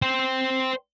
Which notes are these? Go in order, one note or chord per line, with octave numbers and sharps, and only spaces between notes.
C5 G5